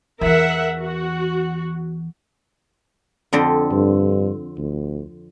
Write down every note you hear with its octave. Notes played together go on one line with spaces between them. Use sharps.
E2 E3 A#4 E5 F#5
F#4
F2 D3 C4
G2
D2